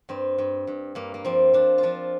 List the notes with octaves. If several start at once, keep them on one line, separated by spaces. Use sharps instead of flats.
G2 C4
G2
G2
G2 A#3
A#3
F3 C4
F3 D4
F4
F3 D4